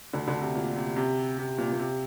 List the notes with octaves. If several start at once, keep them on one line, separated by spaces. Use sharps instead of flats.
D2 D3
D2 D3
C3
A#2
C3
C3
C3
A#2
A#2
C3